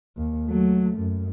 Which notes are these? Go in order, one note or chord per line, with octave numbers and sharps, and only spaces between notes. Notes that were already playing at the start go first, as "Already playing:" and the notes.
D#2
F#3 A3
F#2